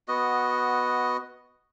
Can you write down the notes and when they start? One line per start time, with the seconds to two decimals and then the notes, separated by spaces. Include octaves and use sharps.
0.08 B3 F#4 D#5